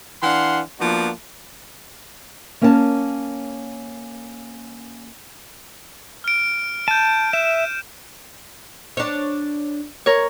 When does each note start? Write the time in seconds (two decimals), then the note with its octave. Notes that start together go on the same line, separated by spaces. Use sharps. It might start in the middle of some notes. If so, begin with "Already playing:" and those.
0.23 E3 D4 F5 F#5 C6
0.80 F3 A#3 B3 D4 F#4
2.61 A#3 C#4 A#4 C#5 F#5 A5
6.24 F6 D7
6.88 A5 G6 D#7
7.33 E5 E7
8.97 D4 C#5
10.06 A#4 C#5